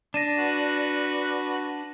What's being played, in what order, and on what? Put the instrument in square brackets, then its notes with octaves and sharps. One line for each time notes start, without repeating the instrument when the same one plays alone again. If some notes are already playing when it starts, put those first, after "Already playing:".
[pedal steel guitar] D4 [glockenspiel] A#6 D#7 E7
[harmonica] F#4 B4